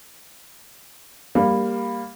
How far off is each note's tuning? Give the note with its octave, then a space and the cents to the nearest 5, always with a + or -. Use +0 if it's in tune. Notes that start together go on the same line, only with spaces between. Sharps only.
G3 +15 A#3 +0